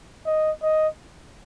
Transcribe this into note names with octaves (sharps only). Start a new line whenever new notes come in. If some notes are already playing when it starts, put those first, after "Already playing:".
D#5
D#5